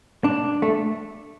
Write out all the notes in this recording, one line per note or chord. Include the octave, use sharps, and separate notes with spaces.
D4
A3